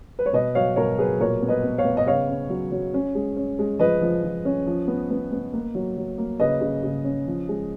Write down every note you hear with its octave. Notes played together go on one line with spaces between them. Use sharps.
B4
C#5
B2 B4 D#5
F#3 C#5 F5
B2 A#4 C#5
F#3 G#4 B4
A#2 A#4 C#5
B3
B4 D#5
B3
C#5 F5
B3
D#5
C#3 C#5 F5
C#4
F#3
F#3
C#4
G#3
C#4
G#3
F3 B4 D#5
F3
F3
C#4
F3
B3
B3
B3
A#3
F#3
F#3
A#3
C#3 B4 D#5
C#3
C#3
C#4
F3
G#3